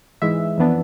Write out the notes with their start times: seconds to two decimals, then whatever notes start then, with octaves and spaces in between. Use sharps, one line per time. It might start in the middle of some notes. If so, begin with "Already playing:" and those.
0.22 G#2 E3 G#3 E5
0.58 F2 E3 B3 D4